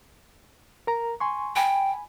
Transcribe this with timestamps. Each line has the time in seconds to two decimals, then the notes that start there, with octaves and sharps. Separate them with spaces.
0.87 A#4 A#5
1.20 G#5 C6 C#6
1.56 G5 G#5 B5